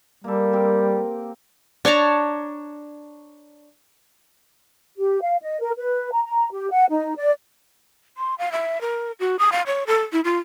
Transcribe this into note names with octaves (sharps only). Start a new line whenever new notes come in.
G3 A#3 A4
C4 G4 A#4
D4 C#5 A5 A#5
G4
F5
D#5
A#4
B4
A#5
A#5
G4
F#5
D#4
D5
C6
F5
E5
A#4
F#4
D#6
F5
C#5
A4
E4
F4